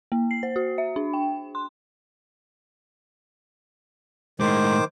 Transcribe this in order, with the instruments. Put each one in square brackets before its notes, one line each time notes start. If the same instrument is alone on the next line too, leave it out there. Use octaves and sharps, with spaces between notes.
[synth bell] A#3
C7
C5
F#4
E5
D4
G5
C6
[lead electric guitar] A2 G#3 [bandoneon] D#3 C5 D6